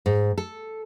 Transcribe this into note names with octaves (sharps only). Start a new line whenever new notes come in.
G#2
A4